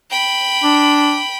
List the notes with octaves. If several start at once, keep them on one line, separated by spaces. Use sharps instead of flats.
G5 B5
D4